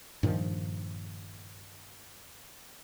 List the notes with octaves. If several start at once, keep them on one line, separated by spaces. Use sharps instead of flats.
G2 A#2 D#3 F3